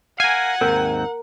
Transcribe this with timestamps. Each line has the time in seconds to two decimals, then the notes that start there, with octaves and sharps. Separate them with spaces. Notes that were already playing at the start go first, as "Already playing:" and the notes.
0.20 A#4 F5 F#5 G#5
0.61 D#2 G#2 C4 A#4